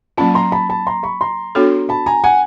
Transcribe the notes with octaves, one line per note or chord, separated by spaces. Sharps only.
F#3 A#3 C#4 F4 A5 B5
A#5 C6
A5 B5
A5 B5
A#5 C6
B5 C#6
A#5 C6
B3 D4 F#4 A4 C#5
A5 B5
G#5 A#5
F#5 G#5